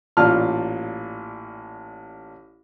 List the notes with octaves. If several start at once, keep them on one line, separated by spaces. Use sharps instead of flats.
A1 A#2 F4 D5 A5 F6